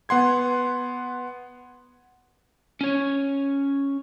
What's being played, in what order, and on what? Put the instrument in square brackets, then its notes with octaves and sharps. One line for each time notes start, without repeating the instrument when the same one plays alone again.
[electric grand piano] B3 F#5 C6 G#6
[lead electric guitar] C#4 C#5